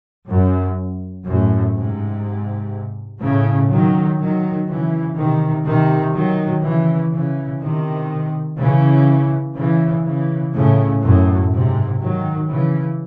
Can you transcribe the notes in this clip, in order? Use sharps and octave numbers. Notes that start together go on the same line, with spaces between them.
F#2
F#2 A2
G#2 C3
A2 C#3
D#3 F#3
D#3 F#3
C#3 E3
C3 D#3
C3 D#3
D#3 F#3
C#3 E3
C#3 E3
C3 D#3
C#3 E3
C#3 E3
C#3 E3
A2 C#3
F#2 A2
G#2 C3
D#3 F#3
C#3 E3